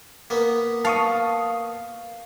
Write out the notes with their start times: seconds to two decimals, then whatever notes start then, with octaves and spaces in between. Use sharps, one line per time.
0.30 A#3 B3
0.85 F5 A5 C#6 D#6